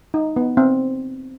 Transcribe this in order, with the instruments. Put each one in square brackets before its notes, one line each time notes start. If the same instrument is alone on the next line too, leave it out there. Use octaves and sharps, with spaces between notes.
[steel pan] D#4
B3
C4